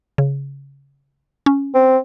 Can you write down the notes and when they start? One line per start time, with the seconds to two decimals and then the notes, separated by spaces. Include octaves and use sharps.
0.18 C#3
1.46 C#4
1.74 C4